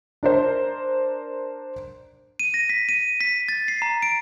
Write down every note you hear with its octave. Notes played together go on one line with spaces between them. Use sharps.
D4 A#4 C5
D#7
A#6
B6
D#7
B6
A6
C7
A#5
D7